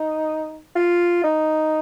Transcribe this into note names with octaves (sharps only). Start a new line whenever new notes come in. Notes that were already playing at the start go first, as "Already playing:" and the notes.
Already playing: D#4
F4
D#4